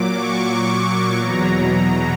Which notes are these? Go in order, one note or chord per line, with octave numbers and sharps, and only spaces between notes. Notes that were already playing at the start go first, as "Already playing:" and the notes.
Already playing: A#2 F#3 D6
C#6
C#6
C#6
E2 B2 F#3 A#5
A#5